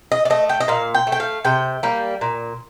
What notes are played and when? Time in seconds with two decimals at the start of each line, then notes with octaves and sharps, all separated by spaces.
0.12 D#5
0.25 D5
0.30 A3 D#5
0.49 G5
0.61 D#5
0.68 A#2 F5
0.94 G5
1.07 A3
1.12 G5
1.20 F5
1.44 C3 G5
1.83 G3 A#3
2.21 A#2